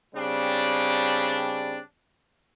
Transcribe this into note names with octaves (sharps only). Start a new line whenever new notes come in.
C#3 G3 C4 D4